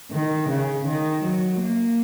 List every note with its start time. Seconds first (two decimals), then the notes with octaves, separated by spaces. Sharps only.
0.11 D#3
0.49 C#3
0.86 D#3
1.24 F#3
1.60 A#3